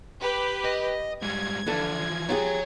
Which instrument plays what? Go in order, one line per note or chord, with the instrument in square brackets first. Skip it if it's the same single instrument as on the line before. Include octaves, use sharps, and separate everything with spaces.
[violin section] G4 B4
[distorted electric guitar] D#5
[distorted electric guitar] G#2 G3 [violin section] G#6
[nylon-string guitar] D3 A4 [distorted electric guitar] E3 F3
[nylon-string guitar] F4 G4 G#4 [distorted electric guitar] C#5 A#5